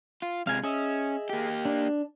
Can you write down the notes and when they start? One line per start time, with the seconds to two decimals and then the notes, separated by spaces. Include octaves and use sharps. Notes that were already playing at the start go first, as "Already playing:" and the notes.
0.22 F4
0.47 C3 G#3 F5 G#5
0.64 C#4 G#4 D#5 E5
1.29 A#3 G4
1.65 D4